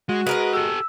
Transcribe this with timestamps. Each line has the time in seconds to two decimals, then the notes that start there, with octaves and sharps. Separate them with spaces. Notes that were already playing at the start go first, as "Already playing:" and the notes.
0.09 G#3 F#4
0.27 G#3 A#4 B4 D#5
0.53 G4 A4 E6